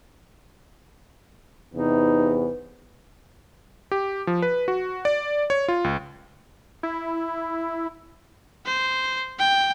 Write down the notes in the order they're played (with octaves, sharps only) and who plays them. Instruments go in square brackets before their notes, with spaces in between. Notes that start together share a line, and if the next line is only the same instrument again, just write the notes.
[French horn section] E2 C3 [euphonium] B3 [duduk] D#4
[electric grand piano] G4
F3
B4
F#4
D5
C#5
F4
C#2
[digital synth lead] E4
[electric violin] C5
G5